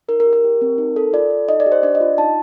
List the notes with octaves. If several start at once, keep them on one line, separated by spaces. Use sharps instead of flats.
D#4 A#4
A#4
G4
A#4
G4
C4
D#4
A4
F4 D5
A4
D#4 D#5
D5
G4
C5
D4 D5
D#5
F4
D#4 A5